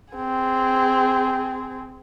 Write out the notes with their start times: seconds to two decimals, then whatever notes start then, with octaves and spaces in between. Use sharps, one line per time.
0.14 C4 G#4